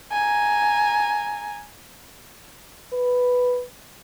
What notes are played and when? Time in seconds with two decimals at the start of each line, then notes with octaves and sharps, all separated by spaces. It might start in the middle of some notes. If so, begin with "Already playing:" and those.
0.12 G#5 A#5
2.93 B4